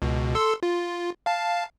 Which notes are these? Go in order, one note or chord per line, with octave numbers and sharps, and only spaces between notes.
C#2 B2
A4 C6 E6
F4
F5 A5